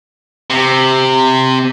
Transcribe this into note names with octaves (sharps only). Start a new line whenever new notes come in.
C3